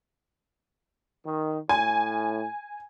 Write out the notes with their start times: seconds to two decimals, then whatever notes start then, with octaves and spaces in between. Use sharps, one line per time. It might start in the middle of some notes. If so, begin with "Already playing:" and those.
1.25 D#3
1.69 A2 G#5